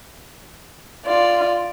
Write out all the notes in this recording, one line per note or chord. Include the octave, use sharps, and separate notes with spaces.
F4 D5